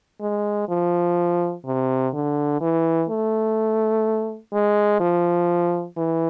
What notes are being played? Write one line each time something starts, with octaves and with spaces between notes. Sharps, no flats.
G#3
F3
C3
D3
E3
A3
G#3
F3
E3